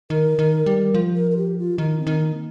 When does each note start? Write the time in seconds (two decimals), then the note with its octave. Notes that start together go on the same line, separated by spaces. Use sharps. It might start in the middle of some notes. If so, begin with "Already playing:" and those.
0.10 D#3 A#4
0.39 D#3
0.66 G3
0.94 F3
1.16 A#4
1.31 A#4
1.37 G4
1.58 F4
1.78 D#3 D#4
1.99 C4
2.07 D#3
2.21 A#3